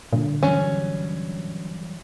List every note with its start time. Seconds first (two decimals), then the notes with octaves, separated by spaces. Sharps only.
0.13 G2 A#2 D3
0.43 E3 F#3 G3 C#4